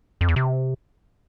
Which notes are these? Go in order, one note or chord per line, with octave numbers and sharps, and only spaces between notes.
F2
E2
C3